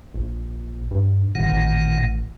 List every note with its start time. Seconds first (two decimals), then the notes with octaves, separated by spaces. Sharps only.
0.14 A#1
0.91 G2
1.35 G1 A#2 D#3 F#5
1.48 A1